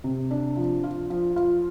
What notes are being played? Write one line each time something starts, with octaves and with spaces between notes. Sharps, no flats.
C3
D4
F3
F4
F3
F4